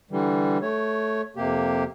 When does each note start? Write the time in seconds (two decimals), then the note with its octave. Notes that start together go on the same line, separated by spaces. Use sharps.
0.11 D3 E3 G3
0.62 A3 C#5
1.36 F2 C3 A#3 G4